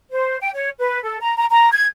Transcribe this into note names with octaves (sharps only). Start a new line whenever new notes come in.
C5
G5
C#5
B4
A4
A#5
A#5
A#5
G#6